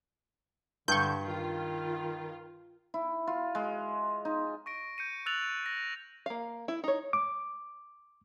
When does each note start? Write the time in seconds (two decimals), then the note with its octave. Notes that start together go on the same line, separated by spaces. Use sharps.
0.88 G2 D3 C#6 G6
1.24 D#3 F4
2.94 E4
3.27 F4
3.55 G#3
4.25 D#4
4.66 C#6 A#6 D7
4.98 G6 C#7 D#7
5.26 E6 F#6 A6 F7 F#7
5.64 A#6 C#7
6.26 A#3 F5
6.68 E4
6.84 D#4 C#5
7.13 D6